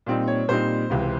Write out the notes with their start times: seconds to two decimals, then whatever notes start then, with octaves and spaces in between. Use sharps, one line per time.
0.06 A#2 G3 C4 D#4
0.28 C#5
0.48 A#2 G3 C4 D#4 C5
0.90 C#2 C3 E3